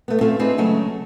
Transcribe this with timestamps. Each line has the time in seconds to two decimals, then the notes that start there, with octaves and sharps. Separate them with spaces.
0.08 A3 B3
0.21 A3 C4 C#4 F4
0.39 C4 D4 D#4 G#4 B4
0.58 C#3 F#3 G#3 A3 C#4